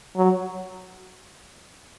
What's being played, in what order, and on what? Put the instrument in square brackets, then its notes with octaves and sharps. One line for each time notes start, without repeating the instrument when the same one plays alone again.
[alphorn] F#3